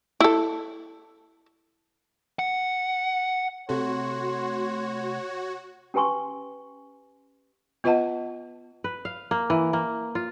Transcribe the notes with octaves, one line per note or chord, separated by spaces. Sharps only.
E4 A4
F#5
C3 A3 F#4 C#5 C6
C#4 G4 B4 G#5 C6 C#6
B3 F4 B4 D#5 F#5 A5
B4
F5
A#3
E3
A#3
F4